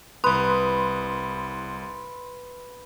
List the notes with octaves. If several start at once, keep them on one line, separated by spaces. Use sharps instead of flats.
C2 B4 C6 D#6